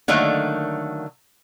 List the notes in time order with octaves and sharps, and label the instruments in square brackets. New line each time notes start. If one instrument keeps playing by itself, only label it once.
[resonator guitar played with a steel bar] D3 D#3 F#3 A3 A#3